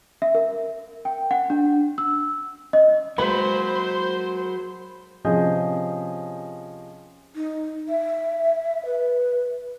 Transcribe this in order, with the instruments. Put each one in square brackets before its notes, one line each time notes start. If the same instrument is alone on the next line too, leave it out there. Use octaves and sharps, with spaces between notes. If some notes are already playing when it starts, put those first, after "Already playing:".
[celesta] E5
A#4
G5
F#5
D4
E6
D#5
[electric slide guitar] F#3 [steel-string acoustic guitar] G#3 A#3 A#4 [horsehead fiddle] C5 [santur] B5
[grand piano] C3 F3 C#4 G#4 D#5 G6
[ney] D#4
E5
B4